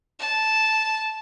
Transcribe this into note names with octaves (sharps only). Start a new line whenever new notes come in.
A5